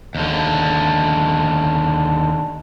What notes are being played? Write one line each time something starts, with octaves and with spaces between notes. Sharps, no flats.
D#2 D3